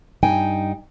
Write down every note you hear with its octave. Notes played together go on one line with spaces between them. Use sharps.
G2 D#4 G5 G#5